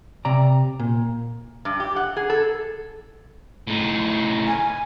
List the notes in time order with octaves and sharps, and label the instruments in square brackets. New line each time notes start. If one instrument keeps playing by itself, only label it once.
[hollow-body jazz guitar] C3 D5 A#5
A#2
[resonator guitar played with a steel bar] G2
G4
F#5
G#4
A4
[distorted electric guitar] A2 D#4
[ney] G#5